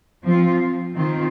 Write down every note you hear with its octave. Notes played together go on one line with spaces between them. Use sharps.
F3 C4 F4
D#3 C4 F4